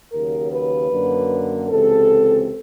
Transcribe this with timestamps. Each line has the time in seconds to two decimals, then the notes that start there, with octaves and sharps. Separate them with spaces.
0.13 D#2 C#3 F#3 A#4
0.52 B4
0.91 F#2 D3 F#3 A#3
1.69 C#2 C3 E3 G#3 C4 A4